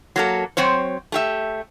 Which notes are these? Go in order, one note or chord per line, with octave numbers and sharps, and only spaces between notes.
F#3 A#3 A4
F#3 C4 C5 C#5
A3 G4 E5